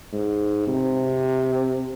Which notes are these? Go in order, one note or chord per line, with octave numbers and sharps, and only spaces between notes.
G#2
C3